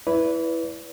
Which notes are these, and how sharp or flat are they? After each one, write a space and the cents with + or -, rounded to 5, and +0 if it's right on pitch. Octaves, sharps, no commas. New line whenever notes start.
E4 +0 B4 +0 D5 -40